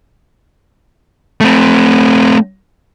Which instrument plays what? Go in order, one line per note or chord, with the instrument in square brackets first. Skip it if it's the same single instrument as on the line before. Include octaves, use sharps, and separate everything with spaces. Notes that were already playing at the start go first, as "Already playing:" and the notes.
[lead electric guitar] A3 C4